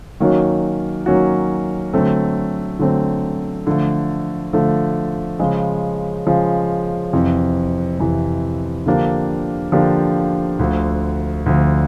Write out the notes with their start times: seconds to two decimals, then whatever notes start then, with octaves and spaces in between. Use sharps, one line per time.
0.20 D#3 F#3 A#3 C#4 F#4
1.06 D#3 F#3 A#3 C#4 F#4
1.93 D3 F#3 A3 C4
2.79 D3 F#3 A3 C4
3.67 D3 F3 A3
4.53 D3 F3 A3
5.39 C#3 F3 G#3
6.26 C#3 F3 G#3
7.13 F2 C3 E3
7.99 F2 C3 E3
8.86 D3 F3 A#3 D4 G4
9.72 D3 F3 A#3 D4 G4
10.59 D2 D3 F3
11.46 D2 D3 F3